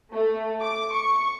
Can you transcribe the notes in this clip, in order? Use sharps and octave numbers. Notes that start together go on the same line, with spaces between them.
A3
D6
C#6